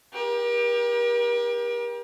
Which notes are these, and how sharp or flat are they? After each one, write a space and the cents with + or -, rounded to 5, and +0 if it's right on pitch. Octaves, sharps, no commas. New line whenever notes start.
G4 +25 A#4 +40